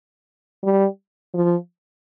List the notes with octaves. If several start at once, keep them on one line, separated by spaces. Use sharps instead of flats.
G3
F3